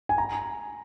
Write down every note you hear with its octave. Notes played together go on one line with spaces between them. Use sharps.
G#5
A#5